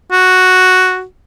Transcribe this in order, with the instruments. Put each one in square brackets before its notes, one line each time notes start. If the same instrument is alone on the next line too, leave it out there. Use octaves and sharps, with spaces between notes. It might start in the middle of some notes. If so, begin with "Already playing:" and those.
[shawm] F#4